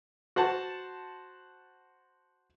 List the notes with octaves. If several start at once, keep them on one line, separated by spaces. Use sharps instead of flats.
F#4 C5 F#5 A5